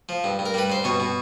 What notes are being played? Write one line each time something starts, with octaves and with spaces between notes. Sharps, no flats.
F3
G2
G2
A#4
G3 B4
G2 C5
B2 C#5
B2